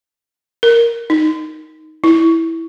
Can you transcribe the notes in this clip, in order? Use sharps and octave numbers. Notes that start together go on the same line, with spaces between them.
A#4
D#4
E4